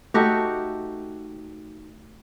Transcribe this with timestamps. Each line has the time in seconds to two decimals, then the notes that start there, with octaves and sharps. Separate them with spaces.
0.14 A3 D#4 F#4 G4